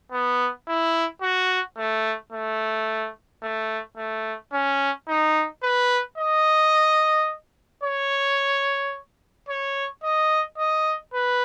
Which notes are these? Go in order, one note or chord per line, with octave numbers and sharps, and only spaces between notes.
B3
E4
F#4
A3
A3
A3
A3
C#4
D#4
B4
D#5
C#5
C#5
D#5
D#5
B4